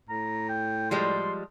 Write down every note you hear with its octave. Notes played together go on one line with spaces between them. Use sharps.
A2 A#5
G5
F3 G3 G#3 C6